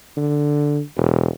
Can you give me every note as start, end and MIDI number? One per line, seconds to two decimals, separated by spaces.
0.17 0.81 50
0.97 1.29 28